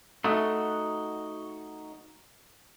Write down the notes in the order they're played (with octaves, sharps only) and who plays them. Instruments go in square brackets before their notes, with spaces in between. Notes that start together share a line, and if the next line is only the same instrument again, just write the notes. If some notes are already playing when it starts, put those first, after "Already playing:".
[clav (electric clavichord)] A3 [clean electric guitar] D#4 F#4